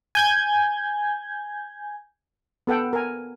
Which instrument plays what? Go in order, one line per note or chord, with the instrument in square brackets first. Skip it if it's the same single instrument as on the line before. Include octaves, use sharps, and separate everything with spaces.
[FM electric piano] G#5 G6 G#6
[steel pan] B3 A4 F#5 G5
A#4 G#5